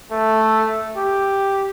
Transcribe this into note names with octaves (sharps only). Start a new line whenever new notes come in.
A3
G4